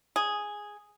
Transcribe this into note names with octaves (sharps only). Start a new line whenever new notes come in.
G#4